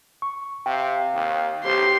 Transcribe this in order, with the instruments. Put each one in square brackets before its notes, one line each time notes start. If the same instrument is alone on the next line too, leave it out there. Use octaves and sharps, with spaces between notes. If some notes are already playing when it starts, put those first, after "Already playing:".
[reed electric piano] C#6
[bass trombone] C3 [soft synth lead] F5 [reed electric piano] G5
[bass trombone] D#2
[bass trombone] B1 [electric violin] G4 C6 [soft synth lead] C5